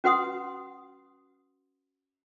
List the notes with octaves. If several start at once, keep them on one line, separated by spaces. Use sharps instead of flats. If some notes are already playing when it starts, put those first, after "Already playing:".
C#4 F#4 B4 F#5 C6 D#6